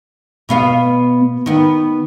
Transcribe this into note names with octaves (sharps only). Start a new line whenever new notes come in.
B2 B3 F5
D#3 B3